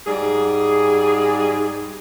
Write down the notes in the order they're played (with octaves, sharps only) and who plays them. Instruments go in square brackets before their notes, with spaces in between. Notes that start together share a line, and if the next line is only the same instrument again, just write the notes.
[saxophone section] G#2 G3 G#4